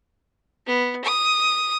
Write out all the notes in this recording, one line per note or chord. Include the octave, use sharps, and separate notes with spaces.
B3
D#6